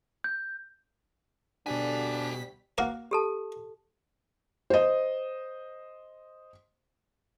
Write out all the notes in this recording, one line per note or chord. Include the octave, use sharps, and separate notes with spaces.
G6
D2 B2 D3 G3 D4 F#4 G#5 B6
A#3 F#4 A#4
G4 A4 A5
C5 D#5